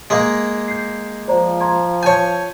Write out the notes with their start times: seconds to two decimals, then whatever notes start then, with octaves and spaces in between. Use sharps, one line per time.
0.10 G#3 A#3
0.68 G6 C7
1.28 F3 C5 D5 A#5
1.61 A#5 C6 G#6
2.03 C#5 G#5 A5 G6